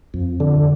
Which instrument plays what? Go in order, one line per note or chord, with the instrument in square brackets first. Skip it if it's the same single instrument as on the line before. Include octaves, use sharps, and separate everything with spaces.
[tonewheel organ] F2
D3